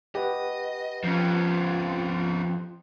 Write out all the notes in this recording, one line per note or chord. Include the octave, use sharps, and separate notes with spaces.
G4 B4 D#5 F#5
F2 F3 C#4 F4